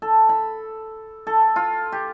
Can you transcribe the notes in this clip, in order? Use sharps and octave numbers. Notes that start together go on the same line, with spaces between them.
A4
B5
A4
F4
G4